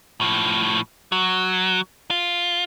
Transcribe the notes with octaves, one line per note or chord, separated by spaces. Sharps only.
A2 F3
F#3
F4